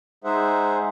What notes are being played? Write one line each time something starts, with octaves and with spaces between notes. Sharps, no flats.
G#3 D#4 G#4 C5 E5 F#5